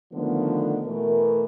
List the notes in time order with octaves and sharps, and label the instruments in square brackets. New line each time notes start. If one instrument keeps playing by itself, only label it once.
[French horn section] D3 D#3 F3 A3 B3
B2 E3 A3 A#4